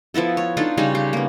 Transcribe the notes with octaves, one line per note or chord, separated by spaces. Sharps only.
F3 B3 E4 A4
C#5
D4 D#4 F4 A4
C#3 G3 C#4 D#4
G4
A#3 B3